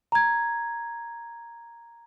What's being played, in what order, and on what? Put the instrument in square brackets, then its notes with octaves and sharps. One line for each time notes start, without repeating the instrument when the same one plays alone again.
[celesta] A#5 G#6